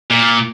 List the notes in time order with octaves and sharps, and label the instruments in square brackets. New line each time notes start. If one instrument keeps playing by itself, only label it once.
[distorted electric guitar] A#2